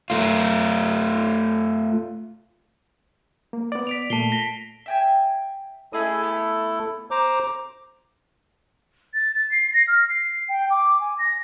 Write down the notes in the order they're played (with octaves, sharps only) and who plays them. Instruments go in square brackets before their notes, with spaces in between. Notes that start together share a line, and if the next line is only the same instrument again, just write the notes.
[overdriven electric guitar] A3 F4
[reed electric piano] A#3
B3 D5
[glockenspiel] B6 D7 F7
[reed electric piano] A#2 A3 [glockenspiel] A5 C7 G7
[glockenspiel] A#6 B6 G7
[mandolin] E5 G5 G#5
[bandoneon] A3 E4 A4 [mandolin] C#4 G#4 D#5
[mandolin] B3
[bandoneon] C5 A#5 D6
[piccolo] A6
A6
C7
A#6
F6
C7
G5
D6
G#5
A#6